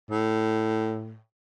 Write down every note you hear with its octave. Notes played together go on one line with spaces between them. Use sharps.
A2